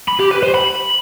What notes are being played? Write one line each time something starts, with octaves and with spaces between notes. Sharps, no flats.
B5
G4
B4
C5
B5